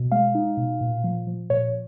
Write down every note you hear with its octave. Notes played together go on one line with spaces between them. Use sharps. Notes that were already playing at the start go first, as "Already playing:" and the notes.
Already playing: B2
G#3 F5
D#4
B2
A#2
F3
F3
A#2 C#5